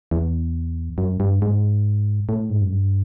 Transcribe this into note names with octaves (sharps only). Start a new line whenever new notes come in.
E2
F#2
G2
G#2
A2
G#2
F#2
G2